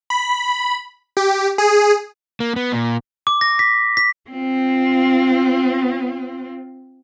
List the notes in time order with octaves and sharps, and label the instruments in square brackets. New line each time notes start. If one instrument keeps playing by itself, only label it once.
[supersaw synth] B5
G4
G#4
[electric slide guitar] A#3
B3
A#2
[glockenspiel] D6
A#6
B6
B6
[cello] C4 F4